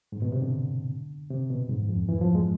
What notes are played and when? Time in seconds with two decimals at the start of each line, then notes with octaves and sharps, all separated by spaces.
0.12 G#2
0.22 B2
0.32 C3
0.42 D3
1.30 C3
1.50 B2
1.70 G#2
1.79 E2
1.89 F2
2.09 E3
2.21 F3
2.35 G#3